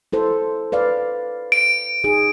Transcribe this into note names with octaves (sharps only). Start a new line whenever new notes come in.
E4 A4 C5
B4 D5 F5
D7
D#4 G#4